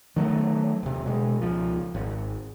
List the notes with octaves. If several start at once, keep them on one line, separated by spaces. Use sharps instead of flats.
D#3 F#3 G#3 A3
D#1 C3
B2 G#3
C#2 F3
G#1